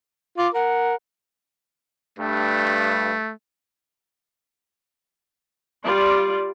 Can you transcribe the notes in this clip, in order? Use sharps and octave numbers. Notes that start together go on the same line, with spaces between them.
F4 D6
A#4 F#5
G2 A3
G3 F4 D5